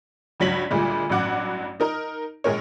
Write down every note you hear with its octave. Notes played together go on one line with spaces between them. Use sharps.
C#2 G2 F#3 C#5 B6 F#7
D2 A#2 G3 G#3
A1 G2 F#3 F#5 D6
D#4 A#4 A#5
A#1 G#3 A#4 C#5